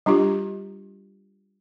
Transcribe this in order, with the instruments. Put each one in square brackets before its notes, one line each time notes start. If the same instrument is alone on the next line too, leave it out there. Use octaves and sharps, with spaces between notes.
[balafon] G3 D4 F4 G4